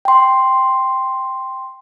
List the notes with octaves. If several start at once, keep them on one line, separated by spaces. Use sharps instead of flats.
G5 C6